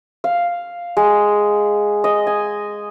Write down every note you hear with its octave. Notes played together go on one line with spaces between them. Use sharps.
F5
G#3
D#5
G#5